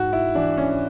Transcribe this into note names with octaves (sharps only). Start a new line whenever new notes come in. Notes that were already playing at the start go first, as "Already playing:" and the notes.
Already playing: G#2 F#4
E4
E3 D4
C#4